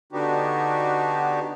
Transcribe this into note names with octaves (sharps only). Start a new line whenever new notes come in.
D3 B3 D4 D#4 F#4 G4